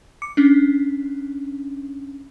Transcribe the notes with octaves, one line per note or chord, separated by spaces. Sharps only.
D6 C#7
C#4 D4